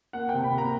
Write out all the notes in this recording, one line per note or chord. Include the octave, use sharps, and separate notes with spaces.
A#3 F#5
G5
C3
B5
A#3 A#5